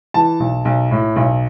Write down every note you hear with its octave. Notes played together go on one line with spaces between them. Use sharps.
E3 A5
B1
B1
A2
B1